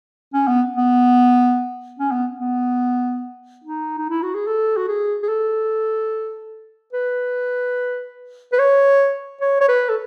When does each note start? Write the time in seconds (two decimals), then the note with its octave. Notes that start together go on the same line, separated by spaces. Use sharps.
0.34 C#4
0.48 B3
0.76 B3
1.99 C#4
2.12 B3
2.40 B3
3.65 D#4
3.98 D#4
4.10 E4
4.23 F#4
4.35 G#4
4.47 A4
4.77 F#4
4.88 G#4
5.23 G#4
5.28 A4
6.93 B4
8.53 B4
8.59 C#5
9.41 C#5
9.61 C#5
9.68 B4
9.89 A4